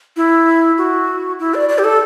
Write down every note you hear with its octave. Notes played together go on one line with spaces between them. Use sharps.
E4
F#4
E4
D5
D5
G4
A4